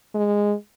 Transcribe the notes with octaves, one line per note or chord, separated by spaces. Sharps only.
G#3